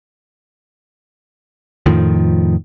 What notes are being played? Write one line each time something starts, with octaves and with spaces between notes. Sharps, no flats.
F2 A2 D#3 F3